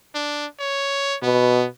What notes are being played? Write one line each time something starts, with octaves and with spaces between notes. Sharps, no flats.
D4
C#5
B2 B3